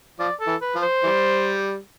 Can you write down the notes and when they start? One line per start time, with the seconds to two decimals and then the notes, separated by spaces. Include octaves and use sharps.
0.19 F3 D5
0.40 A4
0.47 E3
0.62 B4
0.75 F3
0.82 C5
1.03 E3 G3